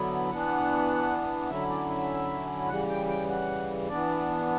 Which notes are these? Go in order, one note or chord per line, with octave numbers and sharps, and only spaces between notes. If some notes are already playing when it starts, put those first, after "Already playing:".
Already playing: D3 F#3 B3 E4
E3 B3 D4 F#5
D3 F#3 C#4 E4 E5
D5
E5
C#3 E3 G3 F#5
G5
G5
F#5
E3 B3 D4 D5